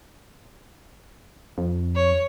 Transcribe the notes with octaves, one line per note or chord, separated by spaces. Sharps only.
F2
C#5